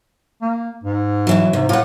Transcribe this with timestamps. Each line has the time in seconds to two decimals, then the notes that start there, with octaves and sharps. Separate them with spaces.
0.42 A#3
0.84 G#2
1.27 B2 E3 F#3
1.53 G#2 C3
1.69 A2 F4 F#5